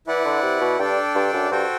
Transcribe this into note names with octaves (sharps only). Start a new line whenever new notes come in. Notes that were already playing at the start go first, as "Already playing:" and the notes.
E3 E4 B4 D5 F#5
D3
C3
B2
G2 D4 A4 D5 G5
G2
F#2
G2 F#4 A4 C5 G5